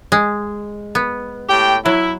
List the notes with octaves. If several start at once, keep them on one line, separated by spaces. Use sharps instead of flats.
G#3
B3
A2 G4 G5
F#3 E4